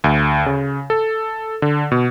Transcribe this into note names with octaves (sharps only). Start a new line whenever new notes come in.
D2
C#3
A4
D3
B2